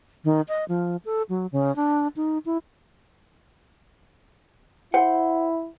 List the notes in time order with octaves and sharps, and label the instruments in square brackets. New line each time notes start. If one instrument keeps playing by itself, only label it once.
[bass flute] D#3
D#5
F3
A4
F#3
C#3
D4
D#4
E4
[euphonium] E4 [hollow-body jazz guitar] C5 F#5